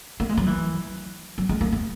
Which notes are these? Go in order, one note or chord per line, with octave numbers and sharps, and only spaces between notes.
A#3
G#3
F#3
E3
F#3
G#3
A#3
B3